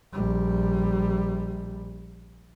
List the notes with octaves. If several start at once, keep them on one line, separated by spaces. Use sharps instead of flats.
A#1 G3